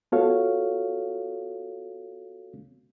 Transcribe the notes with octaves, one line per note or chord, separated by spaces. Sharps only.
B3 F4 F#4 A4 C#5 F5